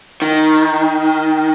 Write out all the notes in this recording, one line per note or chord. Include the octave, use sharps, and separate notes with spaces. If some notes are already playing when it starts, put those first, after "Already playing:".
D#3